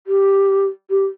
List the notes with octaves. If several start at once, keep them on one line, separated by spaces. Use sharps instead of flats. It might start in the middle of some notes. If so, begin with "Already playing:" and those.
G4
G4